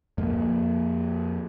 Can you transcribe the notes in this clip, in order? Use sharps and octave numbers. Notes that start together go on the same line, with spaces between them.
F2 A#3